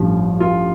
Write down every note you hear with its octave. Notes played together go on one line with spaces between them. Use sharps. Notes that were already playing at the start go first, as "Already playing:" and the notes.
Already playing: A1 G2 F3
F4